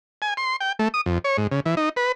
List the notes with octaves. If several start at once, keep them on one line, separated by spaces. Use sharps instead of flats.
G#5
C6
G5
A3
D#6
F2
C#5
G#2
C#3
E3
D#4
B4